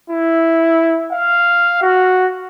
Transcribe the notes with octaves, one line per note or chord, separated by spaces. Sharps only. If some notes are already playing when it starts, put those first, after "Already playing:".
E4
F5
F#4